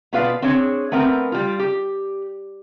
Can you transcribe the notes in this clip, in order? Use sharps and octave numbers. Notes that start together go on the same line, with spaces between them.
B2 B3 F4 B4 D5 F5
C4 D4 G#4 C#5
A3 B3 C4 A#4
G3 F4
G4